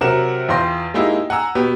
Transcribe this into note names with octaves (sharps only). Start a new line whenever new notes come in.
C3 F#3 A#4 F#5 E7
E2 F4 G5 C6 A#6
G#3 A#3 D#4 E4 G4
F#5 G#5 A#5 E6
B2 B3 G4